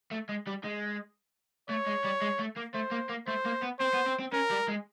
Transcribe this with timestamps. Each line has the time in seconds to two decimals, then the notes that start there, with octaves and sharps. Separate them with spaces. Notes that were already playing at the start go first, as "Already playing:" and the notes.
0.11 A3
0.29 G#3
0.47 G3
0.64 G#3
1.69 A3 C#5
1.86 G#3
2.04 G3
2.22 G#3
2.40 A3
2.57 A#3
2.74 A3 C5
2.92 A#3
3.09 A#3
3.27 A3 C5
3.45 A#3
3.62 B3
3.79 C4 C5
3.93 B3
4.06 C4
4.19 C4
4.32 C#4 A#4
4.50 G3
4.68 G#3